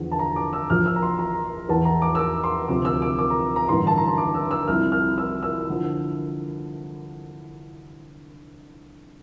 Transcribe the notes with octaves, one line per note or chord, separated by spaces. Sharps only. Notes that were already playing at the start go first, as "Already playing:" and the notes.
Already playing: E2 D3 F3
A5
A#5
D6
E6
A#1 A#2 F3 F6
E6
A#5
C6
A#5
E2 E3 A5
A#5
D6
E6
D6
C6
D2 C3 F3 D6
E6
D6
D6
A#5
A#5
A1 G2 D3 C6
A5
A#5
C6
D6
E6
E6
C2 C3 F3 F6
F6
E6
E6
D3 F3